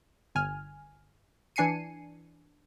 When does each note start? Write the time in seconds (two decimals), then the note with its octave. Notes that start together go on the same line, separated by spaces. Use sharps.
0.35 G1 G#5 F6
1.56 E3 D4 G#5 C7 C#7 D#7